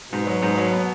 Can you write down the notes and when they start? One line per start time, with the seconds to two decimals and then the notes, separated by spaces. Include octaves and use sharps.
0.13 G#2 B2
0.27 F#3
0.42 G#2
0.58 F#3
0.73 B3